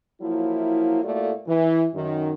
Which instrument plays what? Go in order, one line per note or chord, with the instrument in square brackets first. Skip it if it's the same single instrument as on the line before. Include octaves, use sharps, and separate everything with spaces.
[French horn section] F3 F#3 A#3 E4
A2 A3 A#3 F4 F#4 D5
E3
F#2 D#3